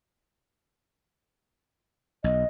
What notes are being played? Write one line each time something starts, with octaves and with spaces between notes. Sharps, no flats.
B1 D#5